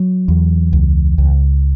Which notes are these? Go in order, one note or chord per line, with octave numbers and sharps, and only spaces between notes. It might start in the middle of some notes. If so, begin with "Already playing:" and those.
Already playing: F#3
E2
C#2
C#2